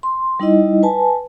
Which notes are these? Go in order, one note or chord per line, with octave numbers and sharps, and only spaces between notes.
C6
G3 D#4 E4 D#5
B4 G#5 A5